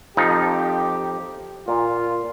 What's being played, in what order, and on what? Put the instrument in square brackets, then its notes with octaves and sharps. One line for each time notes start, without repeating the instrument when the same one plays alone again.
[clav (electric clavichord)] F2 F3 D#4 [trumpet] G4
[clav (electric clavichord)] A#2 [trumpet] F4